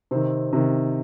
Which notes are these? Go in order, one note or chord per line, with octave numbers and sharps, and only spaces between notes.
C3 D#3 C4
C3 D#3